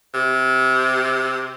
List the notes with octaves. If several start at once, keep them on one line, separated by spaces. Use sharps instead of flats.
C3